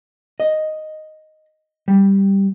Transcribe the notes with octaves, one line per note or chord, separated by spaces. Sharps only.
D#5
G3